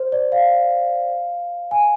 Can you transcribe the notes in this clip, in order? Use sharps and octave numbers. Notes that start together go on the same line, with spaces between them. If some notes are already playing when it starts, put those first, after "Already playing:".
Already playing: C5
D5
F5
G#5